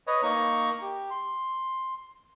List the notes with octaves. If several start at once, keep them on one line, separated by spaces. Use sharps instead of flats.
B4 C#5 D#5
A#3 D#4 A#5 C#6
G4
C6